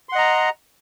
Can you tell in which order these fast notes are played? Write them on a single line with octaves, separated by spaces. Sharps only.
C6 F#5 D#5 A#5